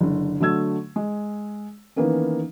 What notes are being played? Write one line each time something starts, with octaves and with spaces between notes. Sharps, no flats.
F#1 D3
D3 F#3 A3 E6 G#6
G#3
D#3 E3 A#3 B3 C#4